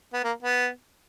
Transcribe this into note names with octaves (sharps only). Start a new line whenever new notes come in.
B3
A#3
B3